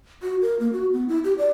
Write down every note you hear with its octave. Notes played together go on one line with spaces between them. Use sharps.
F#4
A#4
A#3
F#4
B3
E4
G4
D5